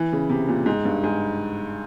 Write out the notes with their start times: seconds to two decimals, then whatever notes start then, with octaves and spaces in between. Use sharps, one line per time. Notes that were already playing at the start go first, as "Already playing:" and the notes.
Already playing: E3
0.12 C#3
0.29 C3
0.48 A#2
0.66 G#2
0.85 G2
1.03 G#2